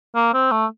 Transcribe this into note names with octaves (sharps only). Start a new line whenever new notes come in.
A#3
C4
A3